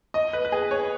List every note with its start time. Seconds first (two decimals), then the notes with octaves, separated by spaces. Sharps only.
0.14 D#5
0.33 B4
0.45 B4
0.52 G#4
0.71 C#5